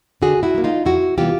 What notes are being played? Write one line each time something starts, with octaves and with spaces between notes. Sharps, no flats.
D3 F#4 G#4
E4 F#4
F#3 A#3
D#4 F4
F2 E4 F#4
C3 E3 G3 B3 F4 G4